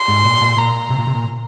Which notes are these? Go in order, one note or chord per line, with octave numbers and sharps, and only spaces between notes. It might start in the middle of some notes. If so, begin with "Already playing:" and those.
Already playing: C6
G#2
A#2
A#2
A#2 A#5
C3
A#2
C3
A#2